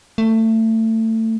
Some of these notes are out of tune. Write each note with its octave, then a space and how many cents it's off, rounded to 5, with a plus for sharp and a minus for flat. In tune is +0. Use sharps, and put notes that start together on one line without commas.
A3 +25